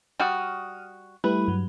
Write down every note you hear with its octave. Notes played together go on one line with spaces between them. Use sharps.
G3 F#4 D#6 F6
G3 A3 E4 B4
G2 F#3